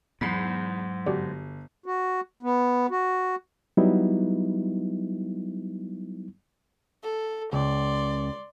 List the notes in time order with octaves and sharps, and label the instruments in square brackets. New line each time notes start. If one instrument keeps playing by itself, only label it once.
[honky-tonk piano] E2 B5 C7 [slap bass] G#2 [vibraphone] F#3
[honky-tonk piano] G1 [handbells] F#4 G4 D5
[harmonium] F#4
B3
F#4
[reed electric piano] F#3 G3 B3 D#4 E4
[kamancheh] A4
[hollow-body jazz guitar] C#2 [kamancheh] D5 C6